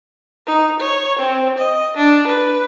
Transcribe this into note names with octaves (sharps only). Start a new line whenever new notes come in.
D#4
C#5
C4
D#5
D4
B4